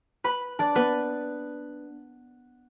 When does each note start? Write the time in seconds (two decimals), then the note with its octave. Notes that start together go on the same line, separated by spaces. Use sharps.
0.24 B4 B5
0.59 D4 D5
0.75 B3 B4